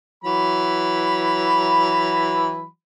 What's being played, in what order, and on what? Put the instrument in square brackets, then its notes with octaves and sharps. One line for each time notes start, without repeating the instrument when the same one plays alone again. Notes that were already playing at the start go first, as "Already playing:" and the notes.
[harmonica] E3 F#3 B5